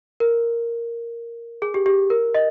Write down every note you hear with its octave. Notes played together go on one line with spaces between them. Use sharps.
A#4
G#4
G4
G4
A#4
D#5